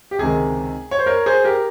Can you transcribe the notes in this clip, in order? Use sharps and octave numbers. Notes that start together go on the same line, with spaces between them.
G4
C#2 C3 D#3 G#4
C#5
C5
A#4 C#5
G#4 C5
G4 A#4